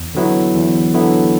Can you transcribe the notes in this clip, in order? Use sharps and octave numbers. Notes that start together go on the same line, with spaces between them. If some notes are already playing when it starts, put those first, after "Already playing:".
Already playing: E2
D3 F#3 B3 E4
E2
D3 F#3 B3 E4